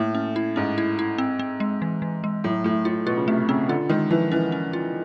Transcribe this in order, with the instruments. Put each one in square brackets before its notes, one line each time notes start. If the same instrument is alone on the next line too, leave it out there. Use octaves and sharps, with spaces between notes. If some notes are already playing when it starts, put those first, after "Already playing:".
Already playing: [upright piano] A2 [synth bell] A3 A#3
[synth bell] C#4
E4
[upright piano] G#2 [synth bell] C#4
[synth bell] E4
E4
C4
C4
G#3
E3
E3
G#3
[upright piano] A2 [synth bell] F#3
[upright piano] A2 [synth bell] A3
[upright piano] A2 [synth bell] F4
[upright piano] B2 [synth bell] F4
[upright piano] C#3
[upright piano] C3 [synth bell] A3
[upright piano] C#3 [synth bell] C4
[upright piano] D3 [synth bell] F4
[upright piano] D#3 [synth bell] G#3
[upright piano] E3 [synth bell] F3
[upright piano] E3 [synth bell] C#4
[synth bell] C#4
F4